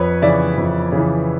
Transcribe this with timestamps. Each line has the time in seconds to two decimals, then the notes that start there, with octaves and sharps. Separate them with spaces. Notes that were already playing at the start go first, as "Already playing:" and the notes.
Already playing: F2 B4 C#5
0.22 C#3 E3 D5 E5
0.58 F2
0.92 C#3 E3